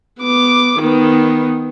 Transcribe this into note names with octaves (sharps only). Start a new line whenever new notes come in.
B3 D6
D#3 B3